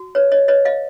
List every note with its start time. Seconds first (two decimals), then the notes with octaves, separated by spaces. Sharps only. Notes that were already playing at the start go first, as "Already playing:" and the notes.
Already playing: F#4
0.15 B4 C#5
0.32 C#5 D#5
0.48 B4 C#5 D#5
0.65 D#5 F5